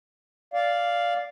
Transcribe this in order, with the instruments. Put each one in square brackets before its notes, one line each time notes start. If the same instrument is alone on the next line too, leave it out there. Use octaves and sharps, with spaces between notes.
[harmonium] D5 F5